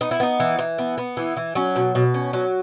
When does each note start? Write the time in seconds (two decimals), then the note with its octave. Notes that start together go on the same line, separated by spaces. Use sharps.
0.01 B3 D#4
0.11 E4
0.20 B3 D#4
0.40 E3
0.59 E3
0.79 B3
0.98 B3
1.17 E3
1.37 E3
1.55 F#3 C#4
1.75 B2
1.95 B2
2.14 C#4
2.33 F#3 C#4